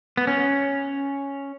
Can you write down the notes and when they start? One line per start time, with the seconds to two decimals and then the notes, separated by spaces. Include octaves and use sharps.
0.17 B3
0.27 C#4